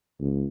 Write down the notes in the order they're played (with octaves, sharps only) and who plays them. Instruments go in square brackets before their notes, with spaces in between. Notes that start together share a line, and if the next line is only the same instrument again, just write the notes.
[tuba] C#2